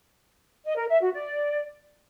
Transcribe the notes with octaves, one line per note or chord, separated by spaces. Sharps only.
D#5
A#4
E5
F#4
D5